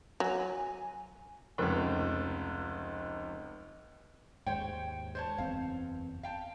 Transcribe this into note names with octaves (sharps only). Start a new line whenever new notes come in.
F#3 G#5
F1 C#2
D#2 G#2 C5 C#5 G5
C5 C#5 A5
F#1 E2 C4 F5
F5 G5 A5